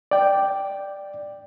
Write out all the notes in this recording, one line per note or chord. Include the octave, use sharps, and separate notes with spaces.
D5 G5